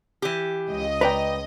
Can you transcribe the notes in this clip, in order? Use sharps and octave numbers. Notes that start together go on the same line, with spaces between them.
E3 G4
C#2 D#5
B4 D5 G5 A#5